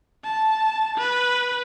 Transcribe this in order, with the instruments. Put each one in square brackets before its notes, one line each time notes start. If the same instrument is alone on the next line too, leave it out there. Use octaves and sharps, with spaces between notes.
[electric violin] A5
B4